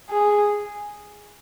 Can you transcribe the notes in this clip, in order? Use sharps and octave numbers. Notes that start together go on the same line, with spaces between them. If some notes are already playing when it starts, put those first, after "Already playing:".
G#4